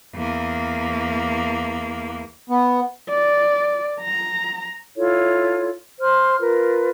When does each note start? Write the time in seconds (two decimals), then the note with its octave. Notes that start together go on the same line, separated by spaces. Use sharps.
0.14 E2 A#3
2.50 B3
3.09 D5
4.01 A#5
4.96 E4 F4 A4 C#5
6.00 C5 C6 F6
6.39 F4 A#4 B4